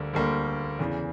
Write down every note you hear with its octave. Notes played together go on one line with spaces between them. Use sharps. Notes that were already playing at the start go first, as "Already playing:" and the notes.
Already playing: D2 D3 G3 A#3
D2 D3 G3 A#3
E2 C#3 E3